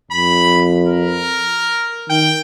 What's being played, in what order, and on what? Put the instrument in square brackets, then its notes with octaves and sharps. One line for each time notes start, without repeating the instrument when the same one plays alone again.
[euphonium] F2 [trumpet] B5
[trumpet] A#4
[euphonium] D#3 [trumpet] G5